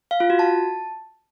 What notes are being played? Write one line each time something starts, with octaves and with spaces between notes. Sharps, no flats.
F5
F4
F#4
A5